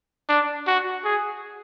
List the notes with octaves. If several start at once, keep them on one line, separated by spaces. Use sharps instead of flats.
D4
F#4
G#4